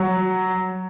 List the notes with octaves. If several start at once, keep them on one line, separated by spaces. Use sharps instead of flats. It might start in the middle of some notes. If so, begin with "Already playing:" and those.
Already playing: F#3